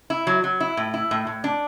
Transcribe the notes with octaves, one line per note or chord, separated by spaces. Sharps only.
E4
F#3
F#3
E4
A2
E4
A2
A2
D4